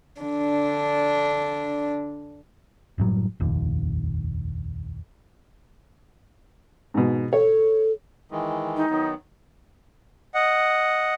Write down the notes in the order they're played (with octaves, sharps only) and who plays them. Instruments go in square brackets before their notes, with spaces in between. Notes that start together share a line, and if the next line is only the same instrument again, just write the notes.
[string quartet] D3 D4
[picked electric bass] F#1 A2 F#3 G3
F1 A#1 D#2
[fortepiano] G#2 B2
[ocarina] A4 [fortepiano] C#5
[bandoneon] D#3 E3 G#3
[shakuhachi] D#4
[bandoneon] D#3 F#3 B3
[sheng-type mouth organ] D#5 F#5